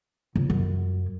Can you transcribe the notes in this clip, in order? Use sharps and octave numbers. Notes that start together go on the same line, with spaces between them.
C#2
F#2